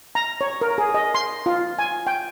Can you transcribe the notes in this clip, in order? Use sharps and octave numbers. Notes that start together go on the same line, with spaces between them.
A#5
C#5
A#4
G#4
D#5
C6
F4
G#5
G5